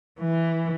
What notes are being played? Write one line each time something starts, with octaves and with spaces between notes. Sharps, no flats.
E3